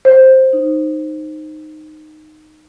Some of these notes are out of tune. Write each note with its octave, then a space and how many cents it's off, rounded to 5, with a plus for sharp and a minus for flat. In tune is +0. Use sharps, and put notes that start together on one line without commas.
C5 +5
D#4 -10